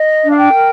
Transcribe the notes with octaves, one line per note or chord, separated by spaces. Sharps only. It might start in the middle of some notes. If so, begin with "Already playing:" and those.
Already playing: D#5
D4
F5
G5
A#4